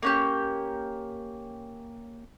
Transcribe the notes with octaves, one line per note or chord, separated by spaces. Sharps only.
A#3 C#4 G4